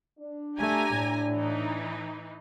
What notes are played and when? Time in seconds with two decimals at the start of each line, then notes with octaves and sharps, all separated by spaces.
0.18 D4
0.59 A3 G4 G#5 A#5
0.94 A2
1.32 E3 D#4